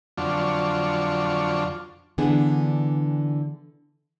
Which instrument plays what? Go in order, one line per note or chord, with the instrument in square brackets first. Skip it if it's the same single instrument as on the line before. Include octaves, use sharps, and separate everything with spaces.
[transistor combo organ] F2 D3 F#3 D4 F4 C#6
[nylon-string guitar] D3 E3 B3 D4 G#4